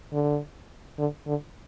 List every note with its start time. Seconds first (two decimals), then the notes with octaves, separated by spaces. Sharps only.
0.13 D3
0.98 D3
1.27 D3